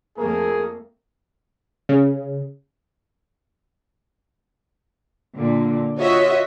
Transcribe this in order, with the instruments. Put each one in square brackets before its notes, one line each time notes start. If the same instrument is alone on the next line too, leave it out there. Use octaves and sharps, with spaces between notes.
[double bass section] F2 A3 A#3 [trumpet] G#4 [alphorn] A#4
[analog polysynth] C#3
[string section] A#2 D3
F4 F#4 C#5 D#5 E5